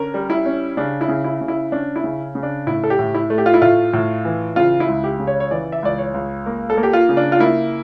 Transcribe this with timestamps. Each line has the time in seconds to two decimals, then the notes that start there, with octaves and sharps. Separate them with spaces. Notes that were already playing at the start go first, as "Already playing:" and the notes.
Already playing: D3 C#4 A#4
0.14 G3
0.30 E4
0.46 C#4
0.77 C#3 D4
1.01 E4
1.09 C#3
1.24 E4
1.41 C#3
1.48 E4
1.72 C#4 D4
1.96 E4
2.04 C#3
2.35 C#3
2.43 D4
2.67 A2 E4
2.84 A4
2.90 G4
2.99 A2
3.14 E4
3.30 A3
3.38 G4
3.46 F4
3.54 E4
3.61 A2 F4
3.93 A2
4.25 E3
4.56 C#3 F4
4.80 E4
4.88 C#2
5.04 G4
5.19 C#3
5.27 C#5
5.40 C#5
5.51 E3 D5
5.72 E5
5.83 C#2 D5
5.98 C#5
6.14 C#2
6.46 A#3
6.70 A4
6.77 A#3
6.83 G4
6.93 F4
7.09 C#3
7.17 D4
7.32 F4
7.40 A#3 E4